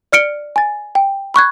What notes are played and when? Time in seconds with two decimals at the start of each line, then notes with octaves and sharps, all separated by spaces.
0.12 D5 F6 C#7 D7 G7
0.56 G#5 A6
0.95 G5
1.34 B5 C#6 F#6 G#6